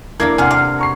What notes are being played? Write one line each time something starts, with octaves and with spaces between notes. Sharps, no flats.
A#3 D4 E4 A4 A#4 G#6
C3 F5 F#5 G#5
F5 F#5 D6
A#5 C#6 C7